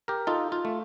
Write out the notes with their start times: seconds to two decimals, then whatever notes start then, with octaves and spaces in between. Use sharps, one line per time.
0.08 G4 A#4
0.27 D#4 F4 A4
0.52 F4
0.65 A3